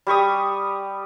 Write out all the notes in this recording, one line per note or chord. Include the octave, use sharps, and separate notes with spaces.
G3 G4 C#6 D#6